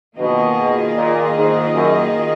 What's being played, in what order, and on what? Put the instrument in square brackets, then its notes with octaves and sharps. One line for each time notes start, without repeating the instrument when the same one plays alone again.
[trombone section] B2 [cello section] D#3 A#3 F4 G#4 D#5
[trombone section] A#2
G#2
F#2